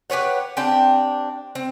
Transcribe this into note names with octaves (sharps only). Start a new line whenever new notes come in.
G4 B4 C#5 F#5
C4 D4 G4 G5
C4